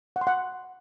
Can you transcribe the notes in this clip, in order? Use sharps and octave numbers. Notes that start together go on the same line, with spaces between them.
F#5
C6
F#5